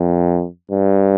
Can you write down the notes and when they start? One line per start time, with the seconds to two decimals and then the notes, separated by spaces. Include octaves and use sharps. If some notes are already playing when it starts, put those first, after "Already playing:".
Already playing: F2
0.71 G2